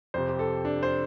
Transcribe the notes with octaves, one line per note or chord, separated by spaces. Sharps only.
F2 C3 C5
G4
A4
D4
C5